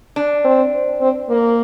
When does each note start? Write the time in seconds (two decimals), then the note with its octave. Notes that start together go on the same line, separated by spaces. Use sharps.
0.16 D4
0.45 C4
1.01 C4
1.30 A#3